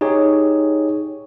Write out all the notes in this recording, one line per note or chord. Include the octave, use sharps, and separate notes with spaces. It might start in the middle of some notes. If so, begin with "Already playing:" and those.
D#4 G4 G#4 C#5